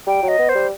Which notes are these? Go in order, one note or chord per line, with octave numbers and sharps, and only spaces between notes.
G3 G5
F#3
D#5
B3
C5
G3